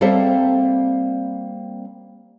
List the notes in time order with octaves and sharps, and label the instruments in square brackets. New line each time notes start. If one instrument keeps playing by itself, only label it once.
[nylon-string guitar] G3 A#3 C4 A4 C5 E5